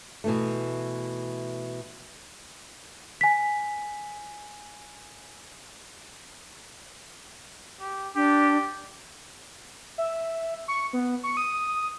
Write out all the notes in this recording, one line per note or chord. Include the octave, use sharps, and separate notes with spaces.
B2 E3 A3
G#5 B6
G4
D4 G4
E5
C#6
B3
C#6
D#6